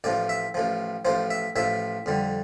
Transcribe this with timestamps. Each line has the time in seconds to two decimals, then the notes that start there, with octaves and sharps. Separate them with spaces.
0.04 A1 A2 F3 D5
0.29 E5
0.54 A1 A2 F3
1.05 A1 A2 F3 C5
1.30 E5
1.56 A1 A2 F3 E5
2.06 F2 D3 G3